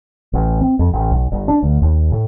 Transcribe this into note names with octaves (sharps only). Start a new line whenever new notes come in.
A1
C4
F2
A1
B1
G1
D4
D2
D#2
A2